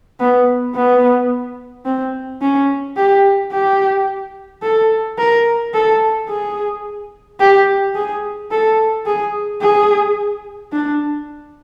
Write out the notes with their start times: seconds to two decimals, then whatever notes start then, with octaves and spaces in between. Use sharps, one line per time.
0.20 B3
0.75 B3
1.85 C4
2.42 C#4
2.97 G4
3.52 G4
4.62 A4
5.18 A#4
5.74 A4
6.29 G#4
7.40 G4
7.95 G#4
8.51 A4
9.06 G#4
9.61 G#4
10.73 D4